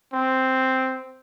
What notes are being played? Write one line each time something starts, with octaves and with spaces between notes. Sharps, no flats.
C4